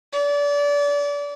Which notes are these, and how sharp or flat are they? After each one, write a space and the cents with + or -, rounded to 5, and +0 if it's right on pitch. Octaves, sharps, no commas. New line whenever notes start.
D5 -30